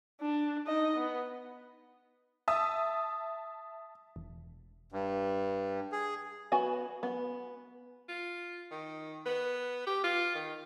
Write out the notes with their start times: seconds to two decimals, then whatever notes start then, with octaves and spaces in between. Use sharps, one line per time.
0.21 D4
0.67 D#4 D#5
0.96 B3
2.48 E5 A5 D#6 E6
4.16 E1
4.92 G2
5.92 G#4
6.52 B3 F#4 G#5
7.03 B3
8.09 F4
8.71 D#3
9.26 B3
9.87 G4
10.04 F4
10.35 D#3